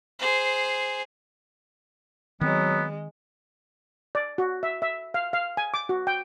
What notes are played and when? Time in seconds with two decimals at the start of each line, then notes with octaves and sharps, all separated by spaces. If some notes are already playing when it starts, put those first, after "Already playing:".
0.19 G#4 C5
2.41 D#3 F#3 G#3 B3 C4
4.15 D5
4.38 F#4
4.63 E5
4.82 E5
5.14 F5
5.33 F5
5.57 G#5
5.74 D6
5.89 F#4
6.07 G5